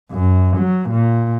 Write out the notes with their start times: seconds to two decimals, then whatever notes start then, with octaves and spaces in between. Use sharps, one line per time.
0.11 F#2
0.58 F#3
0.90 A#2